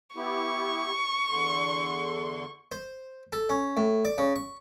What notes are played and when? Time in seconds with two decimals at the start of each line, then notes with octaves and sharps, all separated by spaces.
0.16 B3 E4 G4 C#6
1.29 E2 D3 C6
2.72 C5
3.32 A4
3.49 C#4
3.77 A2
4.05 D5
4.18 C#3
4.36 C#6